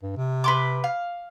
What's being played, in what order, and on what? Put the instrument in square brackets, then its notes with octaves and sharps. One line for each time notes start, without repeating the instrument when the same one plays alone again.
[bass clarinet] G2
C3
[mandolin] B4 C6 D6
F5